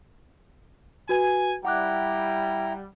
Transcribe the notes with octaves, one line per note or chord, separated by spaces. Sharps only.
F#4 B4 G#5
G3 E4 F#5 G5 A#5 D6 F#6